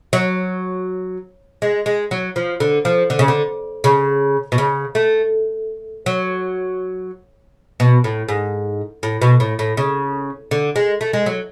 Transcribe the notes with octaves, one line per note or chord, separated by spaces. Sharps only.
F#3
G#3
G#3
F#3
F3
D3
F3
D3
C#3
D3
C#3
B2
C#3
A3
F#3
B2
A2
G#2
A2
B2
A2
A2
C#3
D3
G#3
A3
G#3
F#3